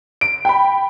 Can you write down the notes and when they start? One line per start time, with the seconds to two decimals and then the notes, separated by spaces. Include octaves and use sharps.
0.21 D7
0.45 G5 B5